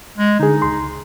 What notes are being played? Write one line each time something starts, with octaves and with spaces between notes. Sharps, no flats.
G#3
D3 D#4 G#4
C#2 C6